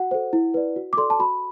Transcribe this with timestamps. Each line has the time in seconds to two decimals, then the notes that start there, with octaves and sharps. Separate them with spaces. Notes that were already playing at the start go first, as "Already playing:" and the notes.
Already playing: F#4 F#5
0.11 A4 C5
0.33 E4
0.54 B4 D5
0.76 F#4
0.93 D6
0.97 A4 D5 C6
1.10 A5
1.20 F#4 B5